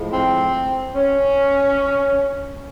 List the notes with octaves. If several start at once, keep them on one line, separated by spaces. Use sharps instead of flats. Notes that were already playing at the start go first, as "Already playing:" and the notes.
Already playing: A2 F3 G#3
C4
C#4